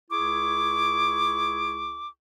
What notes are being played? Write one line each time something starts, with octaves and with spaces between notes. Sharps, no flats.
C#2 E4 G#4 C#6 D6